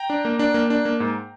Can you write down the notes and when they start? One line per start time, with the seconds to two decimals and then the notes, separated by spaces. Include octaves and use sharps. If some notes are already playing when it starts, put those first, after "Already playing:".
Already playing: G5 A#5
0.10 D4
0.25 A#3
0.39 D4
0.54 A#3
0.70 D4
0.85 A#3
1.00 G#2